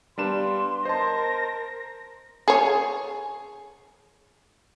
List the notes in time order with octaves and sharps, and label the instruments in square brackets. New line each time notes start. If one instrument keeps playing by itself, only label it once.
[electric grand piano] G3 D4 E7 [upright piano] B3 F5 A5 [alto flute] C6
[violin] A#4 A#6 [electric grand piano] C5 A5 [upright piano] D#5
[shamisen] G#4 C#5